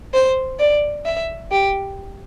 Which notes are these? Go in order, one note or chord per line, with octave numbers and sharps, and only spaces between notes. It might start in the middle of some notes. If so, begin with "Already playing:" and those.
C5
D5
E5
G4